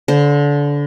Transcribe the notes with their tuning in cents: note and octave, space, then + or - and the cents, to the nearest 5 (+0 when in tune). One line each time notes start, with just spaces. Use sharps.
D3 -25 C5 +0